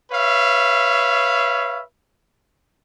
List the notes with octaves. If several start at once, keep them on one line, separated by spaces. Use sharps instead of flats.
B4 C#5 E5 F5